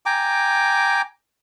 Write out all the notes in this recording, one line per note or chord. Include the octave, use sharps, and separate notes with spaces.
G5 G#5 A#5 D6